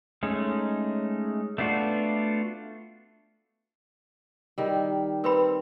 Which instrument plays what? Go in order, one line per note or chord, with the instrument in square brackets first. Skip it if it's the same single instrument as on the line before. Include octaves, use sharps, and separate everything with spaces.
[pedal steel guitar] G#3 A3 C#4 D#4
A3 B3 D4 F4 F#4
[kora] D#3 G3 [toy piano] A#4
[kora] C4 [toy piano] A#4 B4 B5